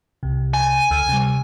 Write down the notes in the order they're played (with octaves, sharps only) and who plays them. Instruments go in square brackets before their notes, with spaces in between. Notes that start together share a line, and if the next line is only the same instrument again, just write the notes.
[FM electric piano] C2 C3
[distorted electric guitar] G#5
[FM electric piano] D2 E6 F6
C3 G3